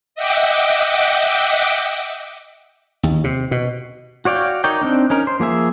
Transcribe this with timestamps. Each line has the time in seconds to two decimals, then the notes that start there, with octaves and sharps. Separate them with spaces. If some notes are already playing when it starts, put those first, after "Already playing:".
0.15 D#5 E5 F#5 G5 D6
3.03 D#2
3.24 C3
3.51 B2
4.25 F#4 C#5 D5 F5 G5
4.64 D#4 A#4 C#5 D5 G5
4.82 C4 D4 D#4
5.10 C#4 D#4 A#4
5.27 C5
5.40 F3 A#3 G#4 E5